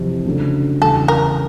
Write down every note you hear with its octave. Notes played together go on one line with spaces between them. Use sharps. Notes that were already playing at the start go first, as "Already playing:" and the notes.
Already playing: F2 C3 E3
C#3 F#3 A3 D4
E2 C#3 E3 G3 A4
A#4